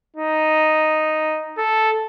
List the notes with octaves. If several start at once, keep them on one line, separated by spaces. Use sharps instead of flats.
D#4
A4